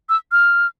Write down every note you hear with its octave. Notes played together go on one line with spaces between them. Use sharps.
E6
F6